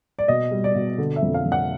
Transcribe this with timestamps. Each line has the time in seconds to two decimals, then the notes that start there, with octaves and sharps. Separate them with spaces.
0.19 D5
0.28 B2 D#5
0.51 G3
0.64 D5
0.75 B2
0.98 D3
1.16 E5
1.22 F2
1.34 F5
1.45 F2
1.52 F#5